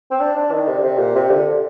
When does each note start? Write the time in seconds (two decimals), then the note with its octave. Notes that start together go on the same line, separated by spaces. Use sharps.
0.11 C4
0.20 D4
0.36 D4
0.52 D#3
0.68 C3
0.79 D3
0.83 C3
0.98 A#2
1.15 C3
1.30 D3